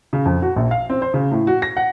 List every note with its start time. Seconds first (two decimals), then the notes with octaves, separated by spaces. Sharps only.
0.13 C#3
0.25 F2
0.42 F#4
0.56 A#1
0.71 F5
0.90 C4
1.02 C5
1.14 C#3
1.31 A2
1.47 F#4
1.62 A#6
1.77 F#5